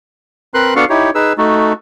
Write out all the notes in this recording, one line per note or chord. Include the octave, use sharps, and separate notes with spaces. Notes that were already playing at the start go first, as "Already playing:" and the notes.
C4 A#4 B4 C6 F#6
B3 D4 F#4 A4 F5 F#5
D#4 E4 G4 C#5
D#4 G#4 B4 E6
A3 D#4 F#4 A4